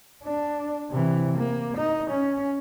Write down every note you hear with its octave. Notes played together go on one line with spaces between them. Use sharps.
D4
C3 E3
A#3
D#4
C#4